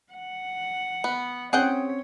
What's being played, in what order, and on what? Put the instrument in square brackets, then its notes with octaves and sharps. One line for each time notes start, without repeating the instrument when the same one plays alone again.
[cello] F#5
[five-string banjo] B3
[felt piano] C4 C#4 [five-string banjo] G#4 F#5 G5 [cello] C#5